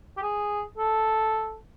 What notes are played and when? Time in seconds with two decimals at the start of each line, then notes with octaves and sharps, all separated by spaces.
0.17 G4
0.22 G#4
0.78 A4